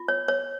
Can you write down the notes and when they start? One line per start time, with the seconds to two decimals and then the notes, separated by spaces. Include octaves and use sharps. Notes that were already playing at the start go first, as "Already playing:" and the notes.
Already playing: F4
0.08 C#5
0.28 C#5